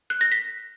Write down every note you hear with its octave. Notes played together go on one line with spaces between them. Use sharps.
F#6
A#6
B6